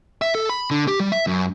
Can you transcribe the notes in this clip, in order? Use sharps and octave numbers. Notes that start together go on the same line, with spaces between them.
E5
A4
B5
D3
G4
G3
E5
F#2